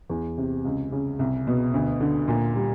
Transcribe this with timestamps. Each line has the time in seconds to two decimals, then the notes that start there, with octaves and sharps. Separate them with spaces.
0.10 E2
0.38 C3
0.65 C#2
0.92 C#3
1.19 C2
1.47 B2
1.74 D2
2.01 D3
2.28 A#2
2.56 G3